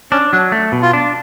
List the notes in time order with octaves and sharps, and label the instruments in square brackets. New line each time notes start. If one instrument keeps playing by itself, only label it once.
[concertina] C#4 [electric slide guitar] D4
[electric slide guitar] F#3 [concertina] D4
[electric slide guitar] A3
B2
[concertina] F4
[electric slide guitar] D4